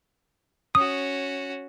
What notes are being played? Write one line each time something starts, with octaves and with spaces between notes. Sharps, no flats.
C#4 F#4 D#6